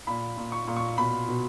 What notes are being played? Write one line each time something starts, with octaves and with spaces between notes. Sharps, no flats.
A#2 B5
A#2
C#6
A#2
C#6
B2 B5
B2